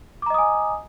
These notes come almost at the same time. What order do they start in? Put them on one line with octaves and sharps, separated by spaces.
D6 A#5 D#5 D#6 G#5